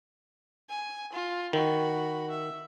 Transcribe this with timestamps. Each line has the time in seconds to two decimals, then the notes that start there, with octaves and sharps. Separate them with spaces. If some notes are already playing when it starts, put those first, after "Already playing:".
0.69 G#5
1.12 F4
1.53 D#3 F#4 B5
2.30 E5